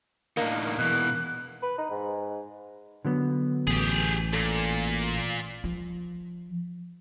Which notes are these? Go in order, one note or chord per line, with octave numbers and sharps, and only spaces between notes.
A2 A#3 D4 D#4
B2 E3 F#6
B4
D#4
G#2
D3 F#3 B3
A1 G4 G#4
A#2 A4
F3